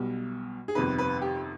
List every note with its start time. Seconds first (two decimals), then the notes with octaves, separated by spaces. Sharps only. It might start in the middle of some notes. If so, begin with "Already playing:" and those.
Already playing: B1 B2 G3
0.68 G#4
0.75 G1 F2 C3 D#3 B4
0.98 B4
1.22 G4